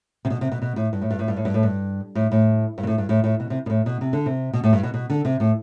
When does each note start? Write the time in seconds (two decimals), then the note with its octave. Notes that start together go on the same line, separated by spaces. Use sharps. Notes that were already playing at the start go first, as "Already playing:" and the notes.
0.25 C3
0.30 B2
0.41 C3
0.52 B2
0.62 B2
0.76 A2
0.93 G2
1.01 A2
1.11 G2
1.19 A2
1.28 G2
1.37 A2
1.45 G2
1.54 A2
1.63 G2
2.15 A2
2.32 A2
2.78 G2
2.83 B2
2.87 A2
2.98 G2
3.09 A2
3.24 A2
3.40 B2
3.50 C3
3.66 B2
3.70 A2
3.86 B2
4.01 C3
4.13 D3
4.26 C3
4.53 B2
4.64 A2
4.73 G2
4.83 B2
4.94 B2
5.10 D3
5.25 C3
5.40 A2